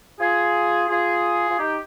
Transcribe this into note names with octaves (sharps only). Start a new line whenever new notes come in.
F4 G#4
F4 G#4
F4
D#4 G4